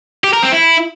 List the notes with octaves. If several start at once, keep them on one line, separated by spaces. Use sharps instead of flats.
G4
A#4
C4
E4